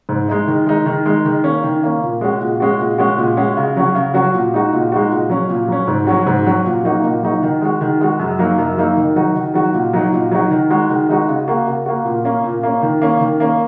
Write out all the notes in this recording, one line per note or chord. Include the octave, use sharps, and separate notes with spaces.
G#2
G#3 D#4
D#3
G#3 D#4
D#3
G#3 D#4
D#3
A#3 C#4
D#3
A#3 C#4
A#2
G#3 C#4 F#4
A#2
G#3 C#4 F#4
A#2
G#3 C#4 F#4
A#2
G#3 C#4 F#4
C#3
F#3 C#4 F#4
C#3
F#3 C#4 F#4
A#2
G#3 D#4 F#4
A#2
G#3 D#4 F#4
A#2
F#3 C#4
A#2
F#3 C#4
G#2
F#3 C#4 F#4
G#2
F#3 C#4 F#4
A#2
F#3 A#3 D#4 F#4
A#2
F#3 A#3 D#4 F#4
D#3
G#3 F#4
D#3
G#3 F#4
F#2
F#3 A#3 D#4
F#2
F#3 A#3 D#4
D#3
F#3 D#4 F#4
D#3
F#3 D#4 F#4
A#2
F#3 D#4 F#4
A#2
F#3 D#4 F#4
D#3
G#3 D#4 F#4
D#3
G#3 D#4 F#4
C#3
A#3 F#4
C#3
A#3 F#4
A#2
A#3 C#4
A#2
A#3 C#4
D#3
A#3 C#4
D#3
A#3 C#4